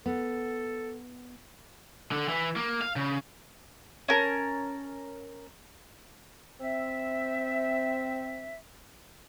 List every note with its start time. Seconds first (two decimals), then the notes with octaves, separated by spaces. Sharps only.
0.06 B3 A4
2.12 D3
2.29 E3
2.56 A#3
2.82 F5
2.96 C#3
4.08 C#4 A#4 A5
6.61 C4 E5